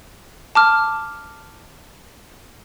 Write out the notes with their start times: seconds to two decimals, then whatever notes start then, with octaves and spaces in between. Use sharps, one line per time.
0.55 A5 D6 F6